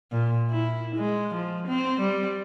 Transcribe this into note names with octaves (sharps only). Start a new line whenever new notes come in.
A#2
E4
G#3
F3
C4
G3